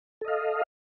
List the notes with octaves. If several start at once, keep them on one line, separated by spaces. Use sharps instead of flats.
A4 D#5 F5